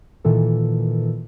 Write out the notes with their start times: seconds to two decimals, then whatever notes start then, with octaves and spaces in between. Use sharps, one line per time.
0.25 A#2 D#3 E3 A4